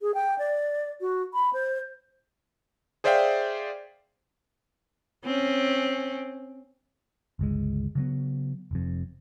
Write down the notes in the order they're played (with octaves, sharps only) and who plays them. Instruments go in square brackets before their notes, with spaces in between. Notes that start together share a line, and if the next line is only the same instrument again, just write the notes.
[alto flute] G#4
G5
D5
F#4
B5
C5
[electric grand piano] G#4 C5 D5 E5 F5 G5
[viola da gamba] C4 C#4
[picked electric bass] G1 C#2 G#3
C#3 F#3 B3
F1 F2